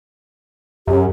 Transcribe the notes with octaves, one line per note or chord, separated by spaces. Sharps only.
F#2 G4